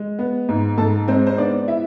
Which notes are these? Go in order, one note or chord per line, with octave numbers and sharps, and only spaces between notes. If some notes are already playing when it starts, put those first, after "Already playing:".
Already playing: G#3
B3
G#2
G#2 A4 A5
G#3 C4 C5
C5
B3 D4 D5
E4 E5